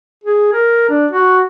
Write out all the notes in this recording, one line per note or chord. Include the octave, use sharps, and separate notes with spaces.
G#4
A#4
D4
F#4